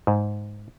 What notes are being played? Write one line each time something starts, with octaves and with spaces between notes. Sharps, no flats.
G#2